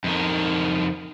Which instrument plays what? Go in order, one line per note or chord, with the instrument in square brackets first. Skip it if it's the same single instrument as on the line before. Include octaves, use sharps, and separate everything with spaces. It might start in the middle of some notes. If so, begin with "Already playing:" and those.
[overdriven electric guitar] F2 D#3